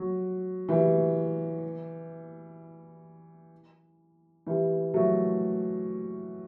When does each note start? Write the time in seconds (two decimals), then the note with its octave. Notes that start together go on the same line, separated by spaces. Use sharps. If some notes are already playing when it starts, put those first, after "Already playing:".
Already playing: F#3
0.68 E3 G3
4.46 E3 G3
4.94 F#3 A3